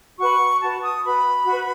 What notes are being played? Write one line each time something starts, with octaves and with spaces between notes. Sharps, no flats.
F#4 B4 C#6
F#4 B4 A5
D#6
F#4 B4 B5
F#4 B4